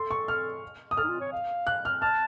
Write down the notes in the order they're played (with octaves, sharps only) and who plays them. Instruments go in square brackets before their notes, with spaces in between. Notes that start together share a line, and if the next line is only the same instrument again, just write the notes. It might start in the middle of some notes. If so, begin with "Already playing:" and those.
Already playing: [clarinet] A4 [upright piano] C6
[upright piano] C#6
F6
D#6
[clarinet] A4 [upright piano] F6
[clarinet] D#4
F4
C#5
F5
[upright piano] F#6
F6
[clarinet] A5 [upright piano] F6